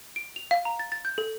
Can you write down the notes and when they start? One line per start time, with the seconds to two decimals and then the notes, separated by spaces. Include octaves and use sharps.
0.16 D7
0.36 F7
0.51 F5
0.65 A#5
0.79 A6
0.92 A6
1.05 G6
1.18 A4